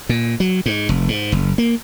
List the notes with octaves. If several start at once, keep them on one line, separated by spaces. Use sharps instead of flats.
A#2
F#3
G#2
F1
G#2
F#1
A#3